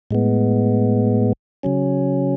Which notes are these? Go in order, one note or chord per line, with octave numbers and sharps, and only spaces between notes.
A2 G#3 B3
C#3 F#3 C#4